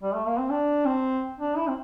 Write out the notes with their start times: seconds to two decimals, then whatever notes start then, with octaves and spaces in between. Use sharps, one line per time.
0.03 G3
0.14 A3
0.27 A#3
0.38 C4
0.50 D4
0.85 C4
1.39 D4
1.57 E4
1.68 C4